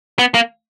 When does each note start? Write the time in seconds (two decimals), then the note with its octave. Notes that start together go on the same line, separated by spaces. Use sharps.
0.19 B3
0.34 A#3